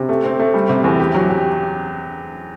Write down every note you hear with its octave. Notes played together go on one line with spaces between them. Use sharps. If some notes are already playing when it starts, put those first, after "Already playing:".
Already playing: C3
A3
C4
A3
G3
C3
E2
G4
F#3
G4